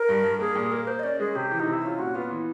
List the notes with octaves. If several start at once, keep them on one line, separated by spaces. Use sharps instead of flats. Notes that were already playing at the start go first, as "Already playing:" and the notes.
Already playing: A#4
G2
G2
A#3 G#4
A#2
A#3 A#4
A#3 C5
D#5
C#4 D5
G#3 G#4
C3 G4
E3
D#4
C3
E4
C#4 F4
A#2 F#4
B3 F4
E3